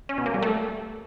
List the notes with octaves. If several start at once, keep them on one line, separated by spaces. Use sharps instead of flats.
C#4
B2
A#3
G3
A3